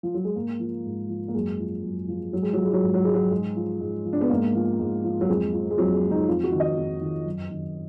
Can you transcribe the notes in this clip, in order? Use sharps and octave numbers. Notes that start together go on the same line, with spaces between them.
F3
F#3
G#3
G#2 A#3
F3
G#2
F3
A#3
F#2 G#3
F3
F#2
F3
G#2 F#3
G#3
F3 F#3
G#3
F#3
G#2 G#3
F#3
F3 G#3
F#3
G#2 G#3
F3
G#2
F3
D4
B3
G#2 A#3
F3
G#2
F3
F#3
F2 G#3
F3
G#3
F2 F#3
G#3
F3
D#4
F2 F4
F#4
D#3
D#5
F2
D#3
F#2
D#3